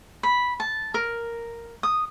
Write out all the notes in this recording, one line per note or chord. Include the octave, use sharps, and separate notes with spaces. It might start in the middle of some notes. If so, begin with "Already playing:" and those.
B5
A5
A#4
D#6